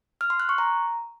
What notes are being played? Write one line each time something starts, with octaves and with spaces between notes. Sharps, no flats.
F6
C6
F#6
C#6
A#5